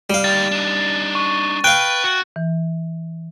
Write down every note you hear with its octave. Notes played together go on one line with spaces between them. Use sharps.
G3 F5
D#4 G4 A6
D4 D#4
C#6
B4 F5 G5 F#6
F#4
E3